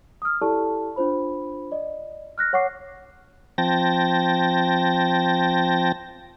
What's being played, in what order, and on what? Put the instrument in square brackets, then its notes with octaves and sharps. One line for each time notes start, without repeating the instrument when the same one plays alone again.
[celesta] D#6 F6
E4 G4 A4 D5 A5 C#6
D4 F4 C5 B5
D5 D#5
F6 F#6 A#6
C#5 F#5 C#6 D6 C7
[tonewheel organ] F3 C4 G5 A5 A#6